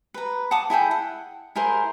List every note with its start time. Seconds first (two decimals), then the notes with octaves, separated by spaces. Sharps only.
0.14 B4 A#5
0.51 F#5 A5 D6 D#6
0.70 E4 G#4 A4 G5
0.91 F#5
1.56 E4 G#4 A#4 C5